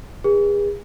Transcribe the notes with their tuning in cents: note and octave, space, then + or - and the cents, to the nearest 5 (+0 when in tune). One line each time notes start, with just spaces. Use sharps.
G#4 -35 B4 -35